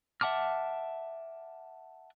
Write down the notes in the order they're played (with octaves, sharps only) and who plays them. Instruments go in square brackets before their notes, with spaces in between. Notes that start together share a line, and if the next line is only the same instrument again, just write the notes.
[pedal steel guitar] E5 F#5 A5 D6 F6